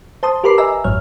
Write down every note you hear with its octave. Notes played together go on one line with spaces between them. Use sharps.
C5 A5 C6 D#6
G4 A#4 B4 B5 D6 C7
D#5 E5 G#5 A#5 E6
A1 F2 G#2 F#3 C#5 F6